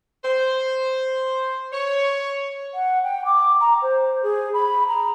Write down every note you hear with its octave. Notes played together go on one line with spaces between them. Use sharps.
C5
C#5
F#5
G5
D6
A#5
C5
G#4
B5
A#5